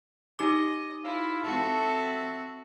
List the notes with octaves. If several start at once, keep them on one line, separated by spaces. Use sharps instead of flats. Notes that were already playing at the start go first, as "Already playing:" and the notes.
D#4 G4 D#5 D6
E4 F4 F5 E6
C4 F#4 A4 E5